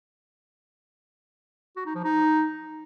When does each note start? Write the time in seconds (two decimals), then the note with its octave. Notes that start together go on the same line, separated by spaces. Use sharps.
1.77 F#4
1.86 D#4
1.95 F3
2.04 D#4